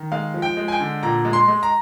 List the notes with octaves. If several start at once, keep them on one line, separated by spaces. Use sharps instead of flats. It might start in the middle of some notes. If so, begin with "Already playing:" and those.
Already playing: D#3
G#3 F5
F3
G5
G#3
G#5
G5
D3
A#2 A#5
G#3
C6
G#3
A#5